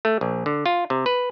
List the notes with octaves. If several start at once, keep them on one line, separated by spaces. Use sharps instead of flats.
A3
A#1
D3
F4
C3
B4